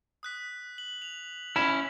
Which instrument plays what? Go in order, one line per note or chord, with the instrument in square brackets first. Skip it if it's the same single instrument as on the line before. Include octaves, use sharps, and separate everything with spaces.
[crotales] D#6 F#6 B6
F#7
F7
[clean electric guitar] C#4 E4 [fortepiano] B5